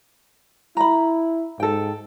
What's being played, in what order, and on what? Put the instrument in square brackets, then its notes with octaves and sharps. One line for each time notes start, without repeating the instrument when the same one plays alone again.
[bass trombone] E4 [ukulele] A#5 B5
[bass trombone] G#2 [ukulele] A4 G5